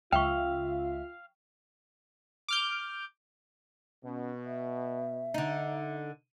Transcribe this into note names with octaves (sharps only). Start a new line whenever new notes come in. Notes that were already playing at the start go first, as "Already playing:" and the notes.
C#2 F4 E5 F5 G5 C#6
D6 F6 G6
B2 C#4
E5
D3 D#4